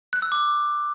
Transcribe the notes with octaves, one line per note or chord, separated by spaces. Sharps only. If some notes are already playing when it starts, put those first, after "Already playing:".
F#6
E6
D6